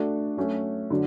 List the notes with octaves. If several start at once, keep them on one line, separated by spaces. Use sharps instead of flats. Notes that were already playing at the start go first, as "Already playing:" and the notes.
Already playing: A3 D4 F#4 A4
F#3 A3 C#4 F#4
D3 F#3